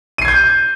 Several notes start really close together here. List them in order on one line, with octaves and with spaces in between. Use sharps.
D#7 C7 G#6 G6